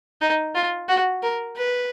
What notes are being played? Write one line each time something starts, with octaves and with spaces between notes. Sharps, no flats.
D#4
F4
F#4
A#4
B4